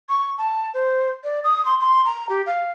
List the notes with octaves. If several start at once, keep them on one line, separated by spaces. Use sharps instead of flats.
C#6
A5
C5
D5
D#6
C6
C6
A#5
G4
F5